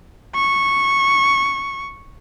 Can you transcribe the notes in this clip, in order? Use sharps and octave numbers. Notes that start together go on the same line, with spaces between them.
C#6